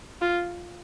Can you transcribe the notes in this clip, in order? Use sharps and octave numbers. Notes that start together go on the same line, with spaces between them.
F4